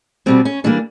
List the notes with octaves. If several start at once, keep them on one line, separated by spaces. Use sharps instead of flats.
B2 G3 B3 C4
C#4
E3 G3 A#3 D4